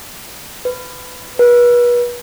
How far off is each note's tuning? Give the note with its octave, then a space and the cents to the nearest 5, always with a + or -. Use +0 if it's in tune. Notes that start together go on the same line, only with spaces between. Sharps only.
B4 +20
B4 -35